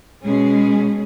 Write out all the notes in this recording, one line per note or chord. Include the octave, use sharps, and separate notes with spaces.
B2 G#3 C#4 G#4